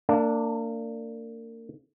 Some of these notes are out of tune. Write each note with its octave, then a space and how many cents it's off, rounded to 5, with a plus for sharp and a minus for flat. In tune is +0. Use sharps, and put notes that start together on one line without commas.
A#3 -35 D4 +0